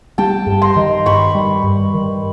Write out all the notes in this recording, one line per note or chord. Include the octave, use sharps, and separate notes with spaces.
G3 G5 A5
G2
A#5 C6
D#3
G2 B5 C#6
G3
G2
D#3